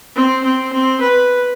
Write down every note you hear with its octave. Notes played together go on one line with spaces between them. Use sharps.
C4
C4
C4
B4